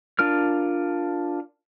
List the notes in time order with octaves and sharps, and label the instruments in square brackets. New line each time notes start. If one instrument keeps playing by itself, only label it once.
[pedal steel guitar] D4 F4 A#4 F6